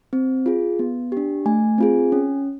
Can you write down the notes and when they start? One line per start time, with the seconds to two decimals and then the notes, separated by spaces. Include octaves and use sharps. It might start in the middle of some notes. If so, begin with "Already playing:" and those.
0.13 C4
0.46 F4 G#4
0.79 B3
1.12 D4 G4
1.46 A3 G#5
1.78 C4 F4 G#4
2.12 C#4